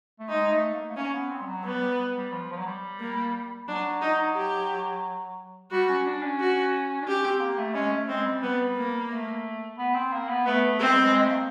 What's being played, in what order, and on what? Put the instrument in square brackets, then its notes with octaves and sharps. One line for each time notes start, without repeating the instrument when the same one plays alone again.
[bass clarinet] A3
[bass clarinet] G#3 [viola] D#4
[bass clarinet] A3
A#3
A3
[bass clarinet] A#3 [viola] C#4
[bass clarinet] B3
C4
G3
F#3
[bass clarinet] G3 [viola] B3
[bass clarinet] G3
G3
F3
F3
F#3
G3
[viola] A#3
[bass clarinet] F#3 [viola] D4
[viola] D#4
G4
[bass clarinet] G3 [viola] F#4
[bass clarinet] C#4
D4
C#4
[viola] F#4
[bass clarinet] D4
[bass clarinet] C#4 [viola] G4
[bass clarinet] C4
A#3
A3
[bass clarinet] G#3 [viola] C#4
[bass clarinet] A3
[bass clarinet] G#3 [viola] C4
[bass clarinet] G3
[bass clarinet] G3 [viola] B3
[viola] A#3
[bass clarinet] A3
B3
C4
A#3
B3
[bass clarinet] A3 [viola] B3
[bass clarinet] A3 [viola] C4
[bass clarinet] G#3
G3
G#3
G#3
A3
A#3